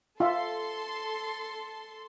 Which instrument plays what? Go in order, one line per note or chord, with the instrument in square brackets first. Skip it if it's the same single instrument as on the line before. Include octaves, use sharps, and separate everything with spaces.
[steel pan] F4 E5 [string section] A4 C6